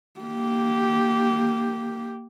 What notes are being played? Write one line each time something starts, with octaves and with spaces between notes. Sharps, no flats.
A#3 G4